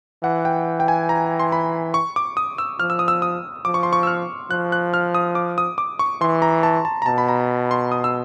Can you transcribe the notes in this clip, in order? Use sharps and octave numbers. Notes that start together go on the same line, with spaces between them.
E3 F#5
G5
G5
G#5
A#5
C6
B5
C#6
D6
D#6
E6
F3 F6
E6
D#6
E6
D#6
F3 D6
C#6
C6
C#6
E6
F6
F3 F#6
F#6
F6
D#6
D6
D#6
D6
C#6
E3 C6
A#5
A5
A5
A#5
B2 A5
B5
A#5
C6
D#6
E6